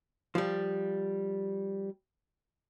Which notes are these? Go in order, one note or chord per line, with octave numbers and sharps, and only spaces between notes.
F3 G3